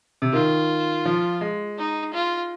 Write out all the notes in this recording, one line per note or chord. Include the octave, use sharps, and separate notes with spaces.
C3
D#3 F4
F3
G#3
D#4
F4